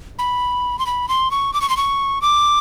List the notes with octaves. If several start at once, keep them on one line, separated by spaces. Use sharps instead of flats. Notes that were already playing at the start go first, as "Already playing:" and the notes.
B5
C6
B5
C6
C#6
D6
C#6
C6
C#6
D6